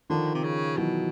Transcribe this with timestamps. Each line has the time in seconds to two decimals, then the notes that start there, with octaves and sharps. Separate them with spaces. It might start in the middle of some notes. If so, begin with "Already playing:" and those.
0.10 D3 D#3 F3
0.34 C3
0.43 C#3
0.77 B2 E3 F#3